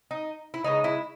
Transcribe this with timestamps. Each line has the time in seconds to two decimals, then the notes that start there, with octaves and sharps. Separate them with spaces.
0.11 D#4
0.54 E4
0.64 C#3 G#3 B3 D#4
0.84 E4